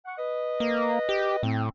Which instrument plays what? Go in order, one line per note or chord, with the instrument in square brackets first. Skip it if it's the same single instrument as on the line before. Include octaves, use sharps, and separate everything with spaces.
[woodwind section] F#5 C#6
B4 D#5
[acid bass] A#3
G4
[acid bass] A2 [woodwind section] C4